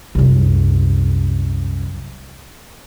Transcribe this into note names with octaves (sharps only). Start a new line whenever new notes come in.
C2 F#2